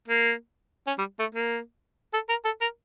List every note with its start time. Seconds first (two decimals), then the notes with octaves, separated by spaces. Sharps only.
0.08 A#3
0.87 C#4
0.98 G3
1.19 A3
1.35 A#3
2.14 A4
2.29 A#4
2.45 A4
2.61 A#4